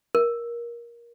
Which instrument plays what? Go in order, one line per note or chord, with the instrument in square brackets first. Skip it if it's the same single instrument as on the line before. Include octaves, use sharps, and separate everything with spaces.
[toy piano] A#4